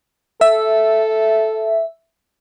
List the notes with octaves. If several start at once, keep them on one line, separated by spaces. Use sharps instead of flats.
A4 E5